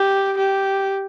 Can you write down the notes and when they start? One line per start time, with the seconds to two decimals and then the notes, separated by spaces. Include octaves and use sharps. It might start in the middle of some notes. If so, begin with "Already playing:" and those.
Already playing: G4
0.38 G4